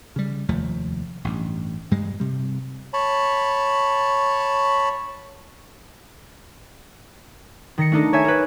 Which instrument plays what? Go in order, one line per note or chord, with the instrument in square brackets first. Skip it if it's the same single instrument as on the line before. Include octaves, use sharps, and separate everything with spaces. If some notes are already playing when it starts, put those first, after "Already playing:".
[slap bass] C#3 G3
F1 D#2 F3 A3
A1 G2
G2 G3 G#3
C3 G3
[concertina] C#5 A5 B5
[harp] D#3 A#6 C#7
A3 D4 D#4 A4
C#5 E5 G#5 G#6
A#4 B4